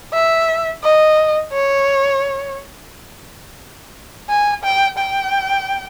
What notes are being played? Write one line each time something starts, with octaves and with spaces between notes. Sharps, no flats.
E5
D#5
C#5
G#5
G5
G5